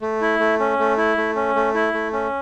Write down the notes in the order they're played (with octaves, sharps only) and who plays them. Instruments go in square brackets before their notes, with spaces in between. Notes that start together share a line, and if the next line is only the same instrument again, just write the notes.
[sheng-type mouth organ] A3
E4
A3
C#4
A3
E4
A3
C#4
A3
E4
A3
C#4